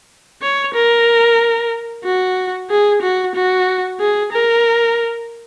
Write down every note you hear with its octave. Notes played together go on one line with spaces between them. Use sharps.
C#5
A#4
F#4
G#4
F#4
F#4
G#4
A#4